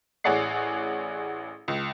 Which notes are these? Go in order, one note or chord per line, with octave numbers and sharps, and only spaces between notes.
A1 G#4 C#5 D5 F#5 C7
C#2